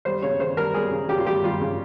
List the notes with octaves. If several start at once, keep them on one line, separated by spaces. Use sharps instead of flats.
G3 C5
C#3 C#5
C#3 C5
G3 A#4
G3 G#4
C#3
C#3 G4
F4
G3 G4
G3 F4
C#3